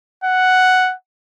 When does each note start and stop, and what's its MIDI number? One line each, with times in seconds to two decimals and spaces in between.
0.24 0.94 78